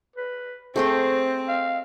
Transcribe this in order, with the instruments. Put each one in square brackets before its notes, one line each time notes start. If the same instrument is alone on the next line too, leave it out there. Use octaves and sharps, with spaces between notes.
[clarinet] B4
[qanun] A3 G#4 G5 [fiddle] C4 [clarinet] C5
[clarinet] F5